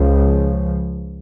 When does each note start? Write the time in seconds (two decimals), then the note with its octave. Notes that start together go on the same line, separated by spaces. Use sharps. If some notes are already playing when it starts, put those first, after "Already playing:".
Already playing: C#2 C#3 F3